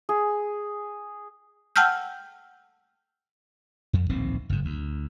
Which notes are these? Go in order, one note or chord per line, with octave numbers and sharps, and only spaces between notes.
G#4
F#5 G5 A5 E6 F6 G6
F2
D1 A#1 D#3 C4
F#1 G#2
D2